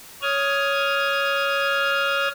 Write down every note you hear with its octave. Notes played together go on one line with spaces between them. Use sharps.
C#5 D#6 F6 G#6